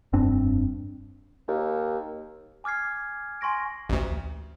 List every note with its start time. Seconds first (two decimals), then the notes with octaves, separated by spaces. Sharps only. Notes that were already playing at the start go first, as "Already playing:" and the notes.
0.13 F1 G2 C4 D4
1.48 D#2
2.64 G#5 D6 F6 G#6 C7
3.41 G#5 C6 C#6 A#6 D7
3.90 A1 D2